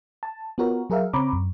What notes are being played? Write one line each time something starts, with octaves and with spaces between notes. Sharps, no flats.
A5
B3 F4 F#4 A#4 C#5
F#3 G#4 A#4 E5 F5
C#3 C4 C#5 A#5 B5 D6
F#2